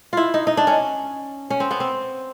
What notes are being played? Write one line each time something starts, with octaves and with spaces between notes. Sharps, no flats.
E4 F4
D#4
D#4
D4
C#4
C#4
C4
B3
C4